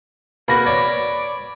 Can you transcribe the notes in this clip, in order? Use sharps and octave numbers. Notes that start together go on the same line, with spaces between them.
B2 A#3 F#4 B5 A#6
C#5 D5 A5